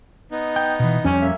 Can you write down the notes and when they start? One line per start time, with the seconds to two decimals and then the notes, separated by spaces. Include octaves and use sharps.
0.31 B3 D#4
0.56 G5
0.80 B2 E3
1.05 F2 G3 C#4 G#5
1.21 A#3 E5